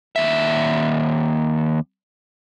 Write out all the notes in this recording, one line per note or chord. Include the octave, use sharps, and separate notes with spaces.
D#2 E5